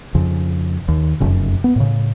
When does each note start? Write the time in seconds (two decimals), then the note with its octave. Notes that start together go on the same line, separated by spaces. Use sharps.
0.15 F2 C#3
0.88 D#2
1.20 F1 F#2 C#3
1.64 B3
1.76 A2 C#3